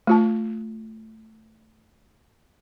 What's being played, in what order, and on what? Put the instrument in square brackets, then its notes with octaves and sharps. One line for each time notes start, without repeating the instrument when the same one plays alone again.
[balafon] A3 F4 A5